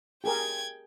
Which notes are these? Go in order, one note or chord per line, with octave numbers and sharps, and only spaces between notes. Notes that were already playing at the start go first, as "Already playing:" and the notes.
G4 G#4 A#4 G5 G#6